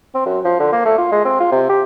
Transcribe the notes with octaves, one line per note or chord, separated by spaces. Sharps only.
C4
F#2
F3
D3
A#3
A3
F4
G#3
C4
F4
C3
G4